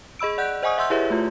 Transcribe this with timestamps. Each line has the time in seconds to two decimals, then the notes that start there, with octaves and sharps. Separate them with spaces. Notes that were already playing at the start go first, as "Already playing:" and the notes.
0.19 G#4 D#5 B5 E6 D7
0.38 D5 F#5 F#6 G6
0.63 C5 D#5 F#5 G#5 C#6 D#6
0.78 E5 F#5 C6 E6 G6
0.90 E4 G4 G#4 B4 C#5 E5
1.10 A3 F4